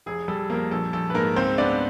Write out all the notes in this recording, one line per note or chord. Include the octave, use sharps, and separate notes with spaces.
F1 G#4
G3 A4
F2 A#3 A#4
A#1 A4
A#1 A4
B4
G#2 A#3 A#4
C#2 C4 C5
B3 D4 D5